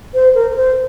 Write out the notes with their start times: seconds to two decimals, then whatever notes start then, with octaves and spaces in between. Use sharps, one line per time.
0.14 C5
0.35 A#4
0.51 A#4
0.56 C5